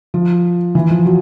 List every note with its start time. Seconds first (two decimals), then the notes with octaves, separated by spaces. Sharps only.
0.14 F3
0.75 E3
0.90 F3
1.05 F#3